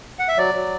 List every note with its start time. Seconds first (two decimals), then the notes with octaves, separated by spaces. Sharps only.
0.19 F#5
0.28 E5
0.37 F#3 D5
0.54 F#3